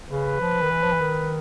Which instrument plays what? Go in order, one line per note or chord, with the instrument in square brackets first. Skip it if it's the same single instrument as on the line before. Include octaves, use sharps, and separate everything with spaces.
[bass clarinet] C#3 [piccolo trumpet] B4
[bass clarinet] F3
D#3
E3
F3
E3
D#3